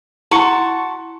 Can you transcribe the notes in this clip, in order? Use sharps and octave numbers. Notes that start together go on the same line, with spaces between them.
E4 F#4 A5 A#5 C6 C#6